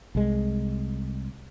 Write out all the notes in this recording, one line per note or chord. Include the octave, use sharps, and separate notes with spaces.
C2 G#3